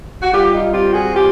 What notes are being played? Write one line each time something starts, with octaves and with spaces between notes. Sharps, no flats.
F#4
G3 F4 G4
D#4 F4
C4 F4 G4
F#4 G#4
G3 F4 G4